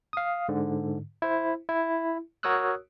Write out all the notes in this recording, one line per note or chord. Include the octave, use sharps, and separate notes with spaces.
F5 D#6
G#2 D3
E4 C5
E4
F#4 A#4 C#5 D#6 E6 F#6